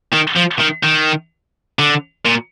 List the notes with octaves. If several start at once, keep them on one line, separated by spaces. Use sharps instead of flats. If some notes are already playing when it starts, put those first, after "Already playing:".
D#3
F3
D#3
D#3
D3
A#2